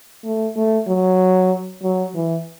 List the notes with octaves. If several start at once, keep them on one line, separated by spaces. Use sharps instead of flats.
A3
A3
F#3
F#3
E3